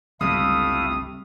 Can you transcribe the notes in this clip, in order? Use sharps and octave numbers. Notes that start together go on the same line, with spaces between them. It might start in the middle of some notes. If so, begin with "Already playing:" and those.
G1 C#2 C3 G3 A3 E4 F5 D#6